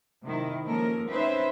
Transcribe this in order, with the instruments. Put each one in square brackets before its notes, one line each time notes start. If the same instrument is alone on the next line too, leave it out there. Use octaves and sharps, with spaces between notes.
[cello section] C3 D#3 E4
F3 G#3 A#3 C#4 A4 A#4
C4 C#4 D#4 B4 C5 E5